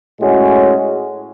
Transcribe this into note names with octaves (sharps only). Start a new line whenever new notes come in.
A2 G#3 C#4 F#4